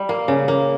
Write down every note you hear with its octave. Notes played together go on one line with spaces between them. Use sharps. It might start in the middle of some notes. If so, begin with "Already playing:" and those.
Already playing: G3
A#3
C#3
A#3